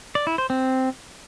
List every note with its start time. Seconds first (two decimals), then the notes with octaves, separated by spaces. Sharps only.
0.15 D5
0.27 E4
0.38 C5
0.50 C4